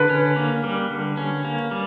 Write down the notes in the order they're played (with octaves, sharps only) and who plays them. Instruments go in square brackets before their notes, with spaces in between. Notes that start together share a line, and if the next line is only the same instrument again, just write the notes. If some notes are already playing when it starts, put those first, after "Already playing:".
Already playing: [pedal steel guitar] D3 [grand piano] B4
[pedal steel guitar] C#4
A#3
G3
D3
C#4
A#3
G3